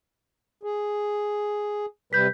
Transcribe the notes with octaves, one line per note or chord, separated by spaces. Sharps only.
G#4
C3 G3 B4 G6 B6